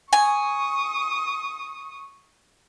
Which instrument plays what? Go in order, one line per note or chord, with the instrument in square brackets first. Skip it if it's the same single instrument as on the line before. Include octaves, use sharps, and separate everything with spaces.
[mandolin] G#5 [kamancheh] C#6 D#6